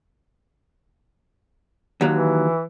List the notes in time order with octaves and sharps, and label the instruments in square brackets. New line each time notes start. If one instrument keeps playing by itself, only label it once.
[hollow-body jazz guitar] D#2 F#3
[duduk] E3